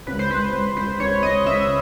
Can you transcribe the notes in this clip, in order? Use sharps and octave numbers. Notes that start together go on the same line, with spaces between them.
C#2 B4
C5
C#2 B4
C#2
C#2 C5
C#2 C#5
C#2 D#5
C#2 E5